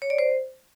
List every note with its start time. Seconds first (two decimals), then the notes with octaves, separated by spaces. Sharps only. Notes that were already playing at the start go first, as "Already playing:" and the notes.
0.02 C#5
0.10 D5
0.19 C5